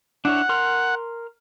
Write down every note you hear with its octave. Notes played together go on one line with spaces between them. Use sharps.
D4 E4 C#5 F#5
A#4 C6 F6